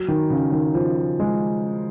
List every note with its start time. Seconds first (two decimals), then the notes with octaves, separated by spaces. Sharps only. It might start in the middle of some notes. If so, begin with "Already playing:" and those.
Already playing: F#3
0.08 D#3
0.30 C#3
0.52 D#3
0.74 F3
1.20 G#3